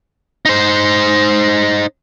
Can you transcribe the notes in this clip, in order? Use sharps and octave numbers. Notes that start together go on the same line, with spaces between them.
D#4 C5